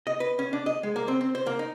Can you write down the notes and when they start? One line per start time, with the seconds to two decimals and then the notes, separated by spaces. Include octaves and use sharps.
0.07 D#5
0.20 B4
0.39 C#4
0.53 D4
0.66 D#5
0.83 G#3
0.96 A#3
1.08 C4
1.21 C4
1.35 C5
1.47 A#3
1.59 D#4